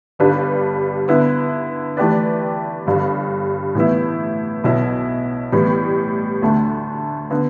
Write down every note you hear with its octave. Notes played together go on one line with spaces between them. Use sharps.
G1 G2 G3 D4 B4
D3 B3 E4 B4
E3 A3 G4 B4 D5
G1 G2 G3
A2 E3 B3 E4
B1 B2 B3 E4
A2 E3 G3 B3
D2 D3 A3
D3 B3